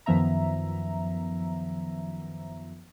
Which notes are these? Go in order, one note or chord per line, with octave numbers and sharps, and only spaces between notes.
F#2 D#3 F3 B3 E5 A#5